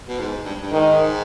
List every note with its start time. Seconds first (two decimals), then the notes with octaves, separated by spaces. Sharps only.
0.08 B2
0.19 G#2
0.45 G2
0.62 G2
0.72 G#2 D#3